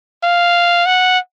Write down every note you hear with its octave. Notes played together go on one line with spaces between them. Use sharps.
F5
F#5